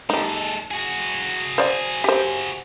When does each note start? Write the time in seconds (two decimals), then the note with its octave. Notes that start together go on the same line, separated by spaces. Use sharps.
0.10 G#3 D#4 G4 A4
0.71 F#4 G#4
1.58 C5 D5 F#5
2.04 G4 C5